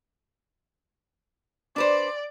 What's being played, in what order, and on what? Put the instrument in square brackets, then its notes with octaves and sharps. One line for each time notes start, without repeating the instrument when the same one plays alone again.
[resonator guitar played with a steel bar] D4 B4 C5 [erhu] D5